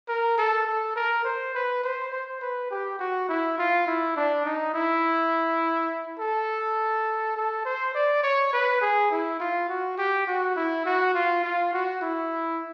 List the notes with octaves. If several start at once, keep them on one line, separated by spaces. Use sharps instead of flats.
A#4
A4
A4
A#4
C5
B4
C5
C5
B4
G4
F#4
E4
F4
E4
D4
D#4
E4
A4
A4
C5
D5
C#5
B4
G#4
E4
F4
F#4
G4
F#4
E4
F#4
F4
F4
F#4
E4